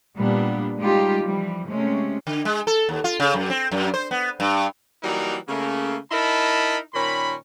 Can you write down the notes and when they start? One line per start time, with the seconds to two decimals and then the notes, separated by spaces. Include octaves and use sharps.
0.17 A#2 G3 B3 D4
0.79 G3 G#3 D#4 F4 G4
1.23 E3 F3 G3
1.67 C3 G#3 A3 C#4
2.27 D3
2.45 G#3
2.67 A4
2.89 D#2
3.04 F4
3.20 C#3
3.34 F#2
3.50 C4
3.71 F#2
3.94 C5
4.11 B3
4.40 G2
5.03 E3 F#3 G3 A#3 D#4 A#4
5.49 C#3 A3 A#3
6.11 D#4 E4 A#4 D#5 A5 B5
6.94 A#2 D#3 C#4 B5